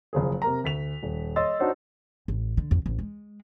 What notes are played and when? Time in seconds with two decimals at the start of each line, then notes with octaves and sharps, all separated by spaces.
0.13 F#1 F3 G#4
0.42 C3 A#4 A#5
0.64 D2 B6 F7
1.03 D#1
1.36 C#5 D#5 C6 E6 A6
1.59 D4 D#4 F#4 C5 C#5
2.28 A1
2.57 D3
2.71 F2
2.86 A1
2.99 G#3